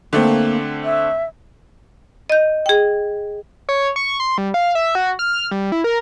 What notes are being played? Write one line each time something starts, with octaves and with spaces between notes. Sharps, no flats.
D3 A3 A#3 C4
E5
D#5 G6
G#4 G5
C#5
C#6
C6
G3
F5
E5
F#4
F6
G3
E4
A#4